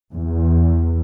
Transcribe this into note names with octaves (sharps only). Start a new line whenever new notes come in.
E2